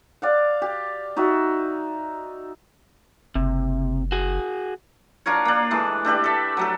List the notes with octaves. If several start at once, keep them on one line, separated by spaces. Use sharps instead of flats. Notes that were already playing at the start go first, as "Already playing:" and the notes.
D5 F5 F#5
G4
D#4 F#4 E5
F#1 C3
F#4 G#4
D4 F4 A#4 C#5
A#3 D4
E3 G#3 A3
A3 D4 G4 B4
A4 E5
F#3 A3 A4